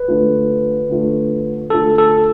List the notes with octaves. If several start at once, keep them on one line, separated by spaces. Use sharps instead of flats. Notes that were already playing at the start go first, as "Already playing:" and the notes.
Already playing: B4
D3 A3 D4 F4
D3 A3 D4 F4
D3 A3 D4 F4 A4
A4